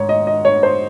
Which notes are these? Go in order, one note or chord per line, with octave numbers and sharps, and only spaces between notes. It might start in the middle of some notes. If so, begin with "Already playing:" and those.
Already playing: G#2 C#5
D#5
D#5
C#5
C5